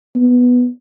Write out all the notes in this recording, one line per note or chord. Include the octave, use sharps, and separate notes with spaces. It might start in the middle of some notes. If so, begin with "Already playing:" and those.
B3